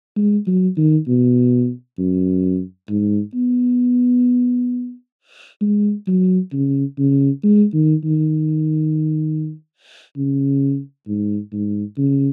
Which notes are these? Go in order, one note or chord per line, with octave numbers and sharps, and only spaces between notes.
G#3
F#3
D#3
B2
F#2
G#2
B3
G#3
F#3
C#3
C#3
G#3
D#3
D#3
C#3
G#2
G#2
C#3